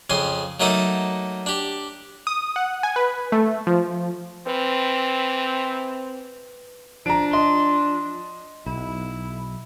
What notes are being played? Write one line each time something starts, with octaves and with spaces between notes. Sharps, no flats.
F2 C#3 G#5 C6
F#3 A3 A#3 D#4 A4 D#6
D4 G4
D#6
F#5
G#5
B4
A3
F3
E3 C4 B4
F3 D4 A#5 D7
D#5 C6
B1 E4